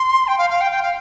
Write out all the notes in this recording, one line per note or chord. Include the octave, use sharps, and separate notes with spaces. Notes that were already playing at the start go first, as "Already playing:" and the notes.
Already playing: C6
G5
F5
F5
G5
G5
F5